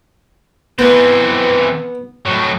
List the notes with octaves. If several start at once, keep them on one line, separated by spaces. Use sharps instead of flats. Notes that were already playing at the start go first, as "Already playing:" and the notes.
E3 B3 C4
A2 F#3